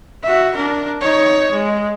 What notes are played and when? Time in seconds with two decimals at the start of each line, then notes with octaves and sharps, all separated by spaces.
0.23 F#4 E5
0.55 D4 A#4
1.01 D#4 C#5
1.52 G#3